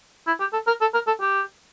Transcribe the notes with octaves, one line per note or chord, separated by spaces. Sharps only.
E4
G4
A4
A#4
A4
A#4
A4
G4